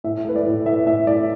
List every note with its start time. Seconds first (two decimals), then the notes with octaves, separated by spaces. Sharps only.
0.04 A2 E5
0.25 A3 B4
0.36 D5
0.46 A2
0.66 A2 E5
0.86 A2 E5
1.07 A2 D5